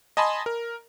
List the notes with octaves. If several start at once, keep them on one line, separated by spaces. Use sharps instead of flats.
D#5 G#5 A5 B5 C6 D#6
A#4